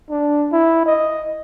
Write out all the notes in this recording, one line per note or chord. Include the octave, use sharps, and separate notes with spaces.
D4
E4
D#5